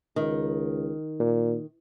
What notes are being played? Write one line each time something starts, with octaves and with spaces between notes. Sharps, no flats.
C#2 D#3
A#2